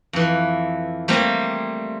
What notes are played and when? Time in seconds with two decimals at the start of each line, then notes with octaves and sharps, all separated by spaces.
0.13 F2 E3
1.08 G3 A3 A#3 C4